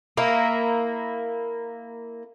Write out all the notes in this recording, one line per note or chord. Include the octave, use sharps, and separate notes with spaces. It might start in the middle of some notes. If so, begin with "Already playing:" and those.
A#3 E4